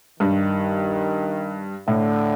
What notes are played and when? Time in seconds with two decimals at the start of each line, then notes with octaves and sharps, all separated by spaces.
0.20 G2 D#3
1.88 A2 D3